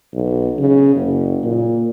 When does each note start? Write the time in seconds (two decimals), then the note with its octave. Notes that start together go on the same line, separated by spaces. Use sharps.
0.14 B1
0.59 C#3
0.95 F#1
1.43 A#2